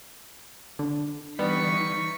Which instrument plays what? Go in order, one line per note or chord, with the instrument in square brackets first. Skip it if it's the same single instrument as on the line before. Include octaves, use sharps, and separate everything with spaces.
[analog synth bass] D3
[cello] E3 D#4 [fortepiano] G3 B3 [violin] C#6 B6